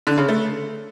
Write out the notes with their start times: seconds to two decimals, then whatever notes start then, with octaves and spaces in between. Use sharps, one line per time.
0.07 D3
0.18 C#3
0.28 A3